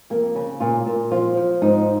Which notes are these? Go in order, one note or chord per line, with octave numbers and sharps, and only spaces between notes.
F2 A#3
C#3
A#2 F4
A#2
F3 F4
F3
G#2 D#4